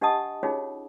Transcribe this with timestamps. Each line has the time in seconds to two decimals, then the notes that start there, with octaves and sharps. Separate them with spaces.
0.01 D4 G4 D#5 F#5 A5 D#6
0.43 C#4 D#4 F4 F#4 G#4 C#5